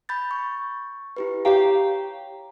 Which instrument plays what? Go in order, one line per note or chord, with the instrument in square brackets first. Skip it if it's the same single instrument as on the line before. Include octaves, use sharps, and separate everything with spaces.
[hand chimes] B5 G6 A6
C#6
E4 G4 B4
[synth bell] G4 F5 G5 [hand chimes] C#5 A#5